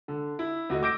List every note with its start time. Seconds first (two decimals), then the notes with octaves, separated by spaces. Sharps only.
0.08 D3
0.39 E4
0.70 D2 F#4 D#5
0.83 D6 E6 G6 A#6 D7